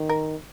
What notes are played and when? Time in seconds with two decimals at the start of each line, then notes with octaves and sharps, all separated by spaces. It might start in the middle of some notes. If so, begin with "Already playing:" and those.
Already playing: D#3
0.09 A#4